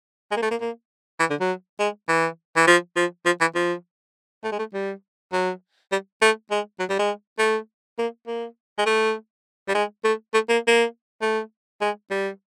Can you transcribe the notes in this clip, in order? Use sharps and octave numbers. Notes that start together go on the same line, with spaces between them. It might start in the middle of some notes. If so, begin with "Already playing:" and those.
G#3
A#3
A3
A#3
A#3
E3
D3
F#3
G#3
E3
E3
F3
F3
F3
E3
F3
A3
G#3
A3
G3
F#3
G3
A3
G#3
F#3
G3
G#3
A3
A#3
A#3
G#3
A3
G3
G#3
A3
A3
A#3
A#3
A3
G#3
G3